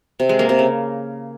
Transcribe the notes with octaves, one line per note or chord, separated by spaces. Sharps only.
C3
G#3
A#3
C3
C#3